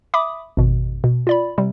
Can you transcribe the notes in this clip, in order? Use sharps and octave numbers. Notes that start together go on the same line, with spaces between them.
E5 B5 D6 D#6
G#1 F2 B2
B2
F4 D5 B5
C3 G3